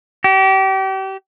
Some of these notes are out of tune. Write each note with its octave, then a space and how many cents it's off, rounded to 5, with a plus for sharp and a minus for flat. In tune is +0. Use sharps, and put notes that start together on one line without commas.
G4 -35